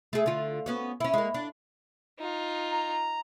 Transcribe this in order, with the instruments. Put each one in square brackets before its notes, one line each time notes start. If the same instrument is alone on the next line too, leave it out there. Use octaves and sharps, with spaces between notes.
[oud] A3 G#4
D3 F4
B3 C#4 F#4
C#4 E4
G#3 A#3
D4
[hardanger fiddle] D#4 F4
[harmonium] A#5